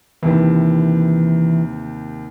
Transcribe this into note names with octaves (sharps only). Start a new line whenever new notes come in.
D#2 C3 E3